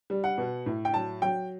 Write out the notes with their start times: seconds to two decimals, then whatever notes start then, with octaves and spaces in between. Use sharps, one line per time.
0.10 G3
0.24 F#5
0.38 B2
0.66 A2
0.85 G5
0.94 F#3 A5
1.22 F#3 G5